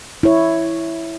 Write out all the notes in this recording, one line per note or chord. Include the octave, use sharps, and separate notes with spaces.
E4 C#5